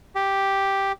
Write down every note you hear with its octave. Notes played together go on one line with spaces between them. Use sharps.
G4